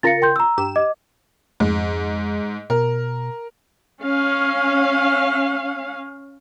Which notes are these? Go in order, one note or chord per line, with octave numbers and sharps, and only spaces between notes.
C#3 F4 A#4 A6 A#6 C#7
G5 C6 G6
A#5 E6
G2 G4 E7
D#5 D6
F2 G#2
B2 A#4
C#4 F5